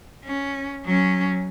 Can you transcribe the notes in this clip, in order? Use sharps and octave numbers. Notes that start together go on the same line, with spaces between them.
C#4
F#3 C#4